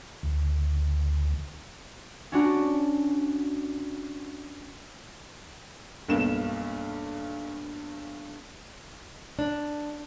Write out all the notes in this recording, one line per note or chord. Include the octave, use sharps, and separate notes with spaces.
D2
C#4 D4 F#4
B1 G2 A#3 E7
D4